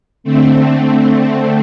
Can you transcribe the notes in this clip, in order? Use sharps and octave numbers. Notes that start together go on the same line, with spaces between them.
D3 A3 C4